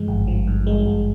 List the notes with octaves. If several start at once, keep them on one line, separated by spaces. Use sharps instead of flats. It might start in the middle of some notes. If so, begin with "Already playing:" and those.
Already playing: G2 F3 G#3
G#1
F3
G2
G#3
G#1